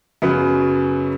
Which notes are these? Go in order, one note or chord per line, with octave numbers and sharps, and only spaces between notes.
F#2 C#3 F#3 B3